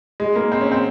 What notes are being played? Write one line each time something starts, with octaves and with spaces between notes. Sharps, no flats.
G#3
A#3
C4
C#4
C4